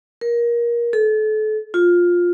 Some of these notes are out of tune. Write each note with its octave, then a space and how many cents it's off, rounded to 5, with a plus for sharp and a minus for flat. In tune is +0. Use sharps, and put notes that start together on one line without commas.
A#4 +20
A4 -35
F4 +10